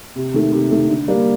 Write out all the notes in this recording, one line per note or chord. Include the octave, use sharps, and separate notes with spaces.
C3
D#3 A3
C3
D#3 A3
D3
G3 A#3 D4